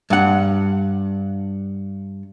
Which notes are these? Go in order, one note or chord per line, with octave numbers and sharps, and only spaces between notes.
G2 F#5